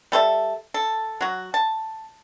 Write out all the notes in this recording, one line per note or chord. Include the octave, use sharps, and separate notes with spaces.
G3 A4 C5 E5
A4
F#3 F#4
A5